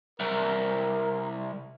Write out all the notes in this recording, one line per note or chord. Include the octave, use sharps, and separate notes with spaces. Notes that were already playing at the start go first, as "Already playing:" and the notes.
C2 A#4